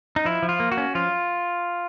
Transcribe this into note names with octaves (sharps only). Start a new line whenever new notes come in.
D#4
F3 E4
F3
F4
A#3
F#4
C#4
F3 F4